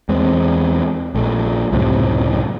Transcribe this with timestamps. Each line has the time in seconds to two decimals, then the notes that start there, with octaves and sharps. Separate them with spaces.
0.09 E2 G#3 C4
1.15 A#1 A3
1.72 C#2 F#2 A2 C3